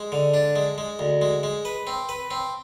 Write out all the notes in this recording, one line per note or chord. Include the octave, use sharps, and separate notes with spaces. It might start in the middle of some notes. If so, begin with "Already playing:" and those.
Already playing: G#3
D3
D4
G#3
G#3
D2
G#3
G#3
B4
C4
B4
C4